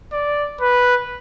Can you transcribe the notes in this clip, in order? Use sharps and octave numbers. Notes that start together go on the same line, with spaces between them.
D5
B4